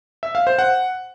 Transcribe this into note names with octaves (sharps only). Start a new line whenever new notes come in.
E5
F5
C5
F#5